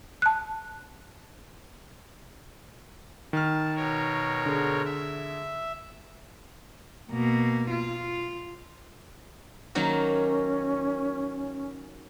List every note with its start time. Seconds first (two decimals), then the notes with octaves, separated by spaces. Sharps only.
0.22 A5 F#6
3.33 D#3 A5 F6
3.76 B2 A#4 C#5
4.46 D3 G#4
4.85 E5
7.12 B2 A#3
7.70 F4
9.75 D#3 F#3 A#3 C#4